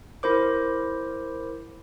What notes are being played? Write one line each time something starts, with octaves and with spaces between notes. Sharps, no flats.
E4 A#4 C5 D6